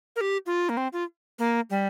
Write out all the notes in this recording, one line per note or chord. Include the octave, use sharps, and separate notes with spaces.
A#4
G4
F4
A#3
C4
F4
A#3
G3